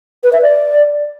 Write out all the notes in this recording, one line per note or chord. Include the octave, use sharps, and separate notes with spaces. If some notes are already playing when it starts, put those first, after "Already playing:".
B4
E5
D5